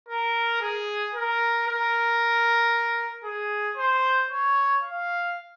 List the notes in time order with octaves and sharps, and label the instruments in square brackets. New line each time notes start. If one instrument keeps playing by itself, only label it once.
[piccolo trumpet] A#4
G#4
A#4
A#4
G#4
C5
C#5
F5